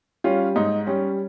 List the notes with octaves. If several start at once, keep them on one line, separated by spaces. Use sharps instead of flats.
G3 C#4 F4
G#2 D#4
G3 C#4